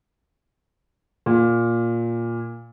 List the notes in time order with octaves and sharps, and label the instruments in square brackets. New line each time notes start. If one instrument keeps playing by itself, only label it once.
[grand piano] A#2